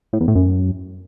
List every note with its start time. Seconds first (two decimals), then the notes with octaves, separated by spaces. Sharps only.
0.13 A2
0.20 E2
0.28 A2
0.35 F#2